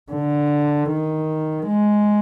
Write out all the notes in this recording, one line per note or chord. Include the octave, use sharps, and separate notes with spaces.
D3
D#3
G#3